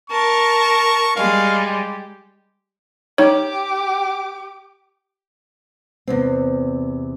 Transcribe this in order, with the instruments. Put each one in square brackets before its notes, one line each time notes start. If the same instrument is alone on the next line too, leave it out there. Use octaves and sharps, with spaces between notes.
[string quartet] A#4 A5 [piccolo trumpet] C#6
[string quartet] G3 G#3 [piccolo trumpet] F5
[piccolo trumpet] G4
[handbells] D#4 C#5 [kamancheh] G4 D6
[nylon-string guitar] E2 C3 C4